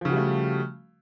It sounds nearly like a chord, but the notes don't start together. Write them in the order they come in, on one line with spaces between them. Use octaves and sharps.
F3 C#3 F#4 G3 A3